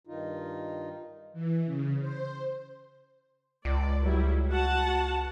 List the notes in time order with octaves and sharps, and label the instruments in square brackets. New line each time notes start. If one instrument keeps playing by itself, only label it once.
[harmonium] G2 D#3 D#4 F4
[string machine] E3
C#3
C5
[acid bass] C#2 [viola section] D5
[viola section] F#3 G3 E4
F#4 F#5 A5